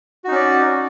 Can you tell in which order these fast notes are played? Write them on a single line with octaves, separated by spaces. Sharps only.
F#4 D#4 C#4 D5